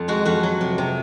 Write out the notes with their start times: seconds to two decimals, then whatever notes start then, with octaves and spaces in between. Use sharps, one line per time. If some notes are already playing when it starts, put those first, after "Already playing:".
Already playing: F2
0.08 G#3 F#4
0.25 F2 F#4
0.43 F#3
0.61 C3
0.78 C3